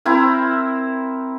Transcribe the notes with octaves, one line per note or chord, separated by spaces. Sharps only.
C4 E4 A#4